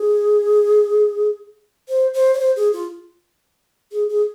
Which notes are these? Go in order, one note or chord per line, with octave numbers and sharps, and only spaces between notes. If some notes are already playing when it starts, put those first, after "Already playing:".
Already playing: G#4
C5
C5
C#5
C5
G#4
F4
G#4
G#4